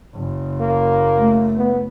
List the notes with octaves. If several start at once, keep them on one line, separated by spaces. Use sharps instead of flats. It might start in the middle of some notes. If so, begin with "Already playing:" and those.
F#1
A#3
A3
B3